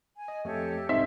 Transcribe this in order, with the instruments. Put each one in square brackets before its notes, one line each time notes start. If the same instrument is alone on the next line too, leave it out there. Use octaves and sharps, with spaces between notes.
[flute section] G#5
[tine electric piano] D#5
[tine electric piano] F2 A3 [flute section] G4 A4 C#5
[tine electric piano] C2 G#2 C6 [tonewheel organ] C4 D#4 [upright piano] E5